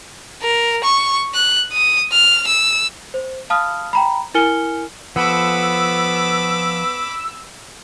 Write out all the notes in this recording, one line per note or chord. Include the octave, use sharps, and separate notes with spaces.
A#4
C#6
F#6
D#6
F6
E6
C5
F5 A5 B5 D#6 F6
G5 A#5 B5
E4 A#4 G#5 F6 C#7 G7
F3 B3 A4 B5 D6 E6